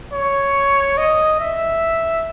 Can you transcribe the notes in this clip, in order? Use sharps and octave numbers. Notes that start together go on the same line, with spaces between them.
C#5
D#5
E5